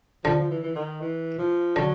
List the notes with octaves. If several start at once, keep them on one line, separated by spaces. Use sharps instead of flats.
D3 F3
F3
E3
E3
D#3
E3
F3
D3 F#3